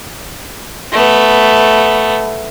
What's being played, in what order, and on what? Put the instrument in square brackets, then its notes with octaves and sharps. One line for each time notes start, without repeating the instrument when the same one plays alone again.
[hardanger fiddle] A3 B3